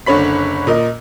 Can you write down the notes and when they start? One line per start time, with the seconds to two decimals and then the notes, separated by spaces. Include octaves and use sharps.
0.06 F#1 D3 C#5 B5 B6
0.67 A#2 A#4 D#5